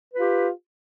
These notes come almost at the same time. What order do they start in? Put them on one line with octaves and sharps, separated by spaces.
B4 F4 G4